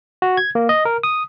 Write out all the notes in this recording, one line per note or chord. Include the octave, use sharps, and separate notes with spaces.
F#4
G#6
A#3
D#5
A#4
D#6